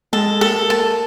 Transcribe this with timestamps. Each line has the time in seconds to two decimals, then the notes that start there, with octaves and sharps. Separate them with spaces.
0.13 G#3 A4
0.41 A#3 A4
0.69 A#3 A5